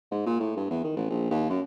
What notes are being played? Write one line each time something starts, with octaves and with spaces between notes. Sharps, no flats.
G#2
A#2
A2
G2
E2
D#3
A1
A#1
D#2
F#2